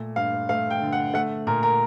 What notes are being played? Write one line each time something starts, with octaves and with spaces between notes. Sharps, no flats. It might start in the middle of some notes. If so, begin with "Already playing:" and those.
Already playing: A#2 A3
G2 F5
A3 F5
G5
D3
F#5
A3 F#5
A#2 A#4
A#4